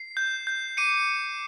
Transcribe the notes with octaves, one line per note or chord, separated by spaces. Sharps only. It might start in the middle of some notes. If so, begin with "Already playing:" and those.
Already playing: C7
G6
G6
D6 C#7 D#7